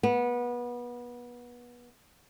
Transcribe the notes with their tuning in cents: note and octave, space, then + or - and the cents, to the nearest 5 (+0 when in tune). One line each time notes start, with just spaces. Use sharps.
B3 -25